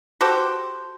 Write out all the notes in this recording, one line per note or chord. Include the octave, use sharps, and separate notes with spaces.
F#4 G4 A4 C5